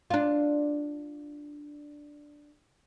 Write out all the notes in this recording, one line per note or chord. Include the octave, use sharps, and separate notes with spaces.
D4 F4